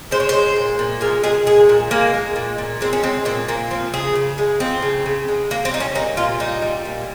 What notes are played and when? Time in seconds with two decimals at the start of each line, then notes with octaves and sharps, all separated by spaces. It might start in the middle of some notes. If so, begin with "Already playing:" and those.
0.11 G#3 C5
0.20 C#5
0.29 G#3 C5
0.56 A#2
0.79 A#2
1.01 G#3 A#4
1.23 G#3 G#4
1.46 A#2 G#4
1.69 A#2
1.91 G#3 A#3
2.14 G#3
2.36 A#2
2.58 A#2
2.81 G#3 C4
2.93 C#4
3.03 G#3 C4
3.25 A#2 C4
3.48 A#2 A#3
3.70 F3 C4
3.94 C#3 G#4
4.15 C#3
4.38 G#3
4.60 F3 C4
4.82 C#3
5.06 C#3
5.28 G#3
5.50 G3 A#3
5.65 C4
5.73 G3 D#4
5.80 C#4
5.95 A#2 D#4
6.17 A#2 F4
6.40 G3 D#4
6.62 G3
6.85 A#2